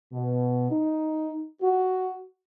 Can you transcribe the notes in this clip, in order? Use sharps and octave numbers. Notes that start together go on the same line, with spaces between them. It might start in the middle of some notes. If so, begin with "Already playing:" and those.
B2
D#4
F#4